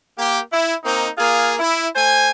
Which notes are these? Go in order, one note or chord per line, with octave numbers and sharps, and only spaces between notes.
A#3 G4
E4
A#3 C4 D#4
A#3 F4 G#4
E4
A3 C5 G#5